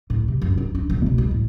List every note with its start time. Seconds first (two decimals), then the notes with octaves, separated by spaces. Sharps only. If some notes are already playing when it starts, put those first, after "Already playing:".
0.10 A2
0.28 C3
0.41 F#2
0.57 D4
0.75 D4
0.90 D#1
1.06 B2
1.18 G#3
1.31 A2